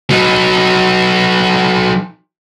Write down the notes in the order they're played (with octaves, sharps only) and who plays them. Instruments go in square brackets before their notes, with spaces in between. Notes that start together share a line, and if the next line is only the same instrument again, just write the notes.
[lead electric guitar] F#3 D#4